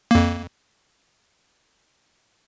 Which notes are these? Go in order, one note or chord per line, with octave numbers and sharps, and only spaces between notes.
F2 A#3